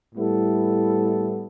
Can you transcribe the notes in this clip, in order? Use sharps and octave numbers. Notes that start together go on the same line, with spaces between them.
A2 G3 B3 E4 A4